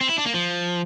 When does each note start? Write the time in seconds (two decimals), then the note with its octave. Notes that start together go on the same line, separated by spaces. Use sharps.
0.01 C4
0.09 E4
0.18 D4
0.26 A#3
0.34 F3